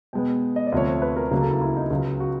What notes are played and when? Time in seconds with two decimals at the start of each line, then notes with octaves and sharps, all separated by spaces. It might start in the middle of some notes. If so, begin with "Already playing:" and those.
0.13 B2 G#3 B3 G5
0.56 D#5
0.67 D5
0.72 D2 C3 F3 A3 C#5
0.87 C5
1.02 B4
1.16 A#4
1.31 C#2 C#3 F#3 A#3 A#4
1.41 A4
1.51 E4
1.61 E4
1.76 D#4
1.90 C#2 C#3 F#3
2.20 F#4